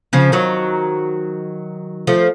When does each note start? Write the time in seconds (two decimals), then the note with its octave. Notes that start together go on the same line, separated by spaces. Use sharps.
0.13 C#3 F3
0.32 D#3 F#3
2.07 F3 A3